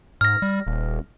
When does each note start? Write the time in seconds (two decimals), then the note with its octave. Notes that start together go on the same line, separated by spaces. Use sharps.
0.21 G#2 F6 A#6
0.42 G3
0.67 D#1